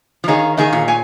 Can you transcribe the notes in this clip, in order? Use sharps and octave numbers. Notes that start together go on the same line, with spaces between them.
F3
D#3 D#4 G#4 C#5 F5
D#3 D#4 G#4 C#5 F5
A#2
C#5 G#5